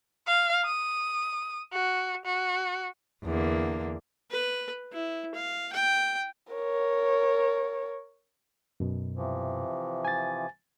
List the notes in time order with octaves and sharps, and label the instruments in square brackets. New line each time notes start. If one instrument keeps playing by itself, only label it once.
[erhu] F5
D#6
F#4
F#4
[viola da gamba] E2 D3 A#3
[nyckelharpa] B4
E4
F5
G5
[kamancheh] A#4 C#5
[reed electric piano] F#2 B2
[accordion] C3 E3 F3
[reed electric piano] G#5 A6